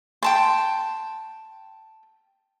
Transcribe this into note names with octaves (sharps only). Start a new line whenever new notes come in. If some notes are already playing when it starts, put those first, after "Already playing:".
G5 A5 C6